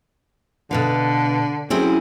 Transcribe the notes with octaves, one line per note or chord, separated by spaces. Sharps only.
B2 D3 B4 F5
F#2 C4 E4 G#4